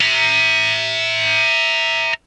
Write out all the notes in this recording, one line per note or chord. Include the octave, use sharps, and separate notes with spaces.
E5 A#5